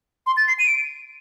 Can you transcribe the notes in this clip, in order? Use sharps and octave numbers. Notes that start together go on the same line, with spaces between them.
C6
A6
C7
D#7
D7